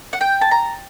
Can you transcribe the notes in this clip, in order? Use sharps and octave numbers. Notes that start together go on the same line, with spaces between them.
F#5
G5
A5
A#5